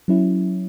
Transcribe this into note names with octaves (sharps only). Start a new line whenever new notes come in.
F#3 C#4 E4